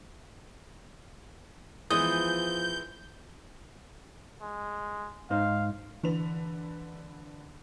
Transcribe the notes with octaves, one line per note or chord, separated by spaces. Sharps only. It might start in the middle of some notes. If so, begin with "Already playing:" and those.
E3 F3 G#3 B3 D#6 G6
G#3
G#2 D#4 C5 F5
D3 E3 B4 F7